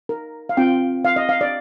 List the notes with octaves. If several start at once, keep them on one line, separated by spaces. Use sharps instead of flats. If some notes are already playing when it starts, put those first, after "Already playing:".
A#4
F5
C4 F4 G5
F5
D#5
F5
D5